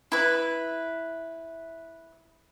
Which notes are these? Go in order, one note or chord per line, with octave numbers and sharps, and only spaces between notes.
E4 B4